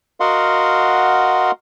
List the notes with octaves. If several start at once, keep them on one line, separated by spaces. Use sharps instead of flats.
F#4 A#4 D#5 F5 F#5 C6